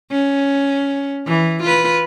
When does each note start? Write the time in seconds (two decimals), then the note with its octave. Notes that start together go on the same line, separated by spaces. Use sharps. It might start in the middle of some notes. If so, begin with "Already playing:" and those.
0.12 C#4
1.27 E3
1.63 F4 B4